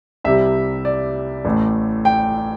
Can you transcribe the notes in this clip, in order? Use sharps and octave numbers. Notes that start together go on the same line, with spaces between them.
C2 C3 G3 E5
D5
A1 A2 A3
G5